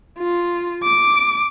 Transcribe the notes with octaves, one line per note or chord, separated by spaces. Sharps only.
F4
D6